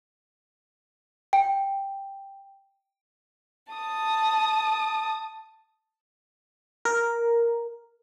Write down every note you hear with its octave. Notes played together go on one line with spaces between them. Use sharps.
G5
A5 D#6
A#4